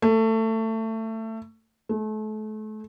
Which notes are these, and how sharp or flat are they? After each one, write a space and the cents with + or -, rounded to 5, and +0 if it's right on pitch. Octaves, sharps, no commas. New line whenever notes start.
A3 +20
A3 -35